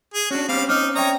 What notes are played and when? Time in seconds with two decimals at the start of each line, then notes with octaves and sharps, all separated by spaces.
0.14 G#4
0.31 C#4 D4 F#4
0.49 G3 C4 C#4 F5
0.69 D#4 D6 F6
0.95 C#5 D5 E5 G5 A#5 D#6